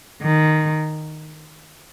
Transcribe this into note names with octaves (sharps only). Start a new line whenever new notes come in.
D#3